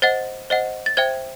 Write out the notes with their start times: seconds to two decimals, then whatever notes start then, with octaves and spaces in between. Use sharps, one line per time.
0.02 C5 D#5 F#5 A6
0.50 C5 D#5 F#5
0.86 A6
0.97 C5 E5 G5 G#6